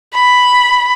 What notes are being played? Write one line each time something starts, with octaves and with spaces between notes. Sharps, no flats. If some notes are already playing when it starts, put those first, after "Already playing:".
B5